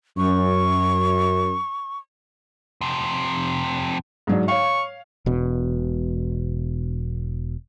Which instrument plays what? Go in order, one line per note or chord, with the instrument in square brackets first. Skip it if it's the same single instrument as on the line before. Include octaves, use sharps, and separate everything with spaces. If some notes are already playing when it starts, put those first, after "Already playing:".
[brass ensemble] F#2 [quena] C#6
[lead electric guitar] F2 C3
[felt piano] G#2 F#3 D4
[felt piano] C#5 F5 [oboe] C#6
[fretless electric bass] E1 B2